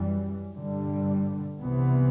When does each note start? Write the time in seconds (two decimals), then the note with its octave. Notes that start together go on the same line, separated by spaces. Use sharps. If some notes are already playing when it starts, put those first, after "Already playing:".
Already playing: F#2 E3 G3
0.54 G2 D3 G3
1.60 C2 C3 E3 B3